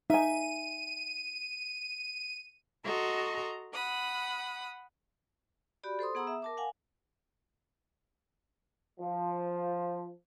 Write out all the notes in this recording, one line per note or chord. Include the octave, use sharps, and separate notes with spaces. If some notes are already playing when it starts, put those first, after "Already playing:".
D#4 E5 G#5 D#7
F#4 A4 D#5 A#5 C6 C#6
F#5 B5 D#6
F#4 G4 D5 B5
A4 C5 C6 D#6
B3 G#4 F#5 A#5 D#6 E6
E5
A#4 A5 D6
F5 F#5 G#5
F3